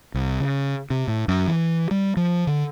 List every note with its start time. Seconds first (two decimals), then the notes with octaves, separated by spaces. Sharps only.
0.14 C2
0.40 C#3
0.90 C3
1.08 A2
1.28 F#2
1.48 E3
1.91 G3
2.17 F3
2.47 D3